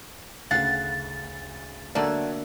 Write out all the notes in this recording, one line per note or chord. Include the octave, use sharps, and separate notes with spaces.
D2 C#3 F5 F#5 A6
D3 F#3 A3 A#3 D5